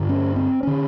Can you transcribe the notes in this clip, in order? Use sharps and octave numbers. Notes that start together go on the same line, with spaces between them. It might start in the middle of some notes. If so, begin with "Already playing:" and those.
Already playing: G2 D3
C#4
C4
D3 C#4